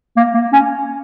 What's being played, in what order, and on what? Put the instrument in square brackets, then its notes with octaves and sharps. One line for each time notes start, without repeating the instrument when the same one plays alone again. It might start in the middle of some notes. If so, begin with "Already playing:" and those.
[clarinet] A#3
A#3
C#4